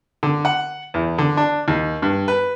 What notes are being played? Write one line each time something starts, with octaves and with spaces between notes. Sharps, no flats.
D3
F#5
E2
D3
D4
D#2
G2
B4